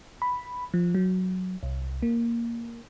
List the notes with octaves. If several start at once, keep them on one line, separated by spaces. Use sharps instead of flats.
B5
F3
F#3
C2
A#3